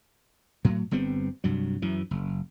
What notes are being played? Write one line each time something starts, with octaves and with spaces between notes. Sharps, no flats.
A2 F#3
G1 G3 B3 C4
C2 G2 F#3
F#2 E3
F#1